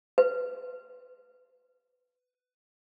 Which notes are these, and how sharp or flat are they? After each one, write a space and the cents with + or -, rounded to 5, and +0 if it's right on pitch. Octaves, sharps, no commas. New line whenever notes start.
B4 +15